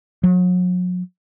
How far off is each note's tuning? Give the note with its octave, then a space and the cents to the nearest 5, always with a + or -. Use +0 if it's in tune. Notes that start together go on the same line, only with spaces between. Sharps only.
F#3 -40